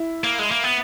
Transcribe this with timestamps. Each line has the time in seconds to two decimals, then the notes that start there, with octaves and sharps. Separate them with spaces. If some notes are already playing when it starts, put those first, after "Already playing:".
Already playing: E4
0.24 A#3
0.39 G#3
0.51 A#3
0.64 B3